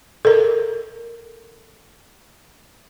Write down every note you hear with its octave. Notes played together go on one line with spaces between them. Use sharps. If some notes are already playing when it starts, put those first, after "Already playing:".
A4 A#4